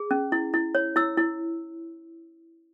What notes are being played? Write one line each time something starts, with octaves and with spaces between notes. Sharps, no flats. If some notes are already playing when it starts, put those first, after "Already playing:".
Already playing: G#4
C#4
E4
E4
C#5
E4 E6
E4